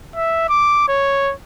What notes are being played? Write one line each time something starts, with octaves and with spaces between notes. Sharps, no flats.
E5
D6
C#5